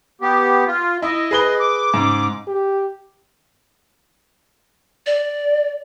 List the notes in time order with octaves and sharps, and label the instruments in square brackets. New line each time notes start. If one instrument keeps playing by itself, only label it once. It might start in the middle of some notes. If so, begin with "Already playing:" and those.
[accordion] B3 G4
F4
[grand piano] E4 [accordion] D#5
[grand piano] G#4 B4 G7
[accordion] D6
[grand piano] G#2 C#3
[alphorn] G4
[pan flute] D5